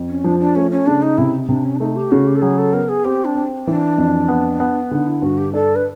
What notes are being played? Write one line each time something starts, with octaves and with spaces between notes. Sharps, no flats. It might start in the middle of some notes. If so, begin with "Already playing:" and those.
Already playing: F2
C#4
F3 D4
D4
A3 C#4
C#4
C#3 D4
D#4
C3 E4
C3 D4
C#4
D4
A3 D#4
G4
C#3 F#4
G4
A4
F#3 G#4
A4
B3 A#4
G#4
C4 G4
D4
C4
E3 D4
F2
B3
B3
D3 D#4
E4
G2 F#4
G4
D4 A4
B4